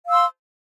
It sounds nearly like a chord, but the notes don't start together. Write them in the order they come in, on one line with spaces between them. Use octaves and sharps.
F5 E6 C6